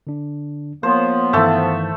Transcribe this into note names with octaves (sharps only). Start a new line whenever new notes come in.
D3 D4
F3 A#3 B3 C5 C#5
G2 D#3 E3 A3 E5 A5